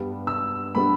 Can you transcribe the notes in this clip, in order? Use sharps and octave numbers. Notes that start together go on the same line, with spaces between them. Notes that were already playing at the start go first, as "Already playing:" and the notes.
Already playing: G2 G3 B3 D4
E6
G3 B3 D4 B5